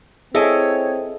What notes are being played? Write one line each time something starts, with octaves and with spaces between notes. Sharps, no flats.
C4 E4 G#4 A4 C#5 D#5